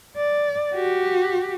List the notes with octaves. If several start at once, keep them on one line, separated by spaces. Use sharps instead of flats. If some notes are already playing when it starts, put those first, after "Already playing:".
D5
F#4 G4